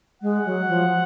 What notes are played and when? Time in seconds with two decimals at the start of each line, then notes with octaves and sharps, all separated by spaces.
0.22 G#3 F#5
0.46 F#3
0.69 F3